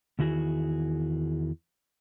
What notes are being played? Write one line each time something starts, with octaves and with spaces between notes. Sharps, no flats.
E2 D#3 E4 F#4 G#4